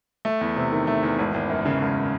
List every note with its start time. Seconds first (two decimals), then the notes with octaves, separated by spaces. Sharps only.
0.25 A3
0.41 E2
0.57 C3
0.72 D#3
0.87 A3
1.03 E2
1.19 G#1
1.34 G#1
1.50 F#2
1.65 C#3
1.81 G#1